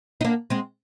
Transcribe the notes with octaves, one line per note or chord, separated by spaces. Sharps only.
D#4
A#3 D4
G#3 C4